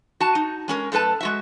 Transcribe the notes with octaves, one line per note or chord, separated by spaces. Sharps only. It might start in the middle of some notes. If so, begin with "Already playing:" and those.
F#4 A5
D#4
G#3 C#4 A#4
F#2 A3 A4 B4 A5
G#3 F#4 E5